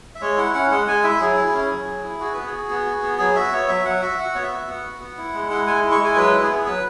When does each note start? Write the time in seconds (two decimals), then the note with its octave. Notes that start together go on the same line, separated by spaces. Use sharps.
0.15 E5
0.21 G#3 C#5
0.38 E4 F#5
0.54 C#4 F#5
0.71 G#3 F#5
0.88 G#3 G#5
1.04 E4 E5
1.20 F#3 G#4
1.37 E4
1.54 C#4
1.70 F#3
1.87 F#3
2.03 E4
2.20 F#4 G#4
2.33 B3 B4
2.46 G#4
2.52 F#4
2.69 B3
2.86 F#4
3.03 B3
3.19 F#3 G#4
3.36 F#4 E5
3.52 B3 C#5
3.69 F#3 E5
3.85 F#3 F#5
4.02 F#4 E5
4.18 F#4 F#5
4.35 B3 C#5
4.43 E5
4.51 F#4
4.68 B3 F#5
4.85 F#4
5.01 B3
5.17 E4
5.34 G#3
5.50 E4
5.67 G#3 G#5
5.84 E4
5.91 C#6
6.00 G#3 G#5
6.16 F#3 B4
6.33 E4
6.42 G#4
6.50 B3
6.66 F#3 B4